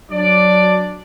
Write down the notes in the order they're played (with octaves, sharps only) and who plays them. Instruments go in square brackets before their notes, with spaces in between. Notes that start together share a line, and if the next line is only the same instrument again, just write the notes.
[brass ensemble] F#3 D4 D5